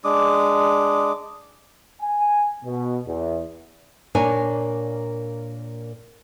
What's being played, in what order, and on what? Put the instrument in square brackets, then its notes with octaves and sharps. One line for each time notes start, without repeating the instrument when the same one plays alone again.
[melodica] G#3 D4 D6 D#6
[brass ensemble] G#5
B2
E2
[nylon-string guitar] A#2 A#3 D4 A#4 C#5 G#5